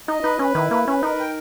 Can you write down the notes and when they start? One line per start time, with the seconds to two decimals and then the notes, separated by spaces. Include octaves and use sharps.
0.08 D#4 D#5
0.23 D#4 B4
0.39 C#4 B4
0.55 D#3 E4
0.71 A#3 B4
0.87 C#4 B4
1.03 D#4 A#4
1.20 G5